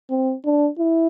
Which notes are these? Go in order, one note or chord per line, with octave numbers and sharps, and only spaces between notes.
C4
D4
E4